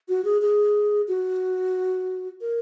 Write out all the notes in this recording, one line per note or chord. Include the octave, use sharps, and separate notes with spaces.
F#4
G#4
G#4
F#4
A#4